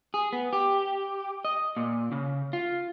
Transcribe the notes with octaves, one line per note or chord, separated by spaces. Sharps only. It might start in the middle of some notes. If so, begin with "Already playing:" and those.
G#4
B3
G4
D#5
A#2
C#3
F4